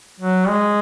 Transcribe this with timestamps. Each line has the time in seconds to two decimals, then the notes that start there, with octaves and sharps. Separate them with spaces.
0.20 F#3
0.48 G#3